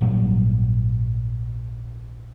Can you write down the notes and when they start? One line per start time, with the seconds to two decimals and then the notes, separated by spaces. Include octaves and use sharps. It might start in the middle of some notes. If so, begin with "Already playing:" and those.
0.01 A#1 G#2 F#3 G3